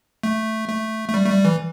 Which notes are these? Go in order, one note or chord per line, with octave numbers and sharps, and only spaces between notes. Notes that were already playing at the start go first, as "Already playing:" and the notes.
A3
A3
A3
G3
A3
G3
E3